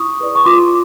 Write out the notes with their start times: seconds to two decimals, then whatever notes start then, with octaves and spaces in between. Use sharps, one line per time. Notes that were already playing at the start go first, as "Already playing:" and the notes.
Already playing: E4 C#6 D#6
0.20 G#4 B4 D5
0.35 C#6
0.45 F4 C6 D6